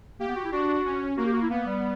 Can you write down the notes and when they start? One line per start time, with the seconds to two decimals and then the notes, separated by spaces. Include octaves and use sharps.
0.20 A#3 G4
0.28 B3
0.36 F#4
0.45 E4
0.52 D4 F#4
0.85 C#4
1.17 A#3 F#4
1.26 G4
1.34 F#4
1.42 E4
1.50 A#3 B3
1.66 G3